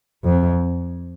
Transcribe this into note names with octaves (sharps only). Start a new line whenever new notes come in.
F2